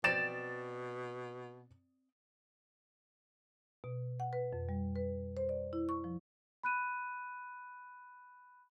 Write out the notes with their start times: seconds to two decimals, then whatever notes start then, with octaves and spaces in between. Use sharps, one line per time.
0.04 B2 C4 D5 A6 E7
3.84 B2
4.20 F#5
4.33 B4
4.53 F2
4.69 G3
4.96 B4
5.37 C5
5.49 D5
5.73 E4
5.89 C#6
6.04 F3
6.63 B5 F#6 D#7